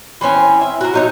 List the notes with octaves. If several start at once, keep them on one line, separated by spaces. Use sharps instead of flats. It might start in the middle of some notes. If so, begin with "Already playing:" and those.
E3 C4 C#4 G#5
E5
F#4 A#4
F#3 D#4 C#5